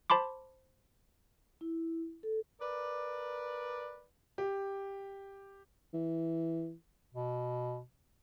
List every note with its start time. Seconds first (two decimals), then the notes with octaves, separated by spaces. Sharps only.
0.10 C5 A5 B5 C6 D6
1.61 E4
2.23 A4
2.61 A#4 B4 D5
4.38 G4
5.93 E3
7.14 B2